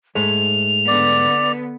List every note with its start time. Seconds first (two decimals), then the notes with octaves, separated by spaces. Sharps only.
0.15 G#2 G#3 A3 F7
0.87 D3 B3 D5